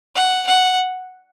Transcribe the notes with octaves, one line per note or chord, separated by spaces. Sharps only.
F#5
F#5